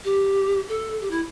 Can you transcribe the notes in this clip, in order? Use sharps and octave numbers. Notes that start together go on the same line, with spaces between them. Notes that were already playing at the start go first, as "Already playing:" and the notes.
G4
A4
G4
E4